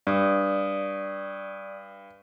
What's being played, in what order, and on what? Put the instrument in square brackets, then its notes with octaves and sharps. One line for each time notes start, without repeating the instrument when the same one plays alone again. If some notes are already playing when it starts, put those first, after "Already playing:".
[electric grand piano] G2 [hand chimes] D5 D#6